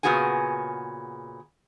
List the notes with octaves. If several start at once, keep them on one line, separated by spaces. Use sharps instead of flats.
A#2 C#3 B3 F#4 G#4 G#5